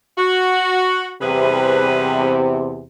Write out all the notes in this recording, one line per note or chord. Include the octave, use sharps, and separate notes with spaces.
F#4
E2 C3 G3 G#4 B4